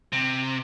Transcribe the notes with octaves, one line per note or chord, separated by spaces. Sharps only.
C3